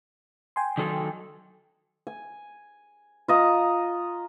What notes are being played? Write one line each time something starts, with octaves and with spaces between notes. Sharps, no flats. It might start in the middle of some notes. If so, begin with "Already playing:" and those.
G5 G#5 C6
D#3 F#3 A4
G#5
F4 D#5 A#5